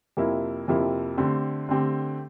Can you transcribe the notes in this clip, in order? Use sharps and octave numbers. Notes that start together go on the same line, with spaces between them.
F2 C3 F3 A#3 E4
F2 C3 F3 A#3 E4
D3 A3 C4 G4
D3 A3 C4 G4